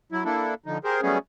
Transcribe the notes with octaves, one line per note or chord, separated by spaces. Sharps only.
F#3 E4
A#3 D4 E4 A4
D3 F3 D#4
G4 G#4 A#4 C5
F#3 G3 A3 B3 C#4 G#4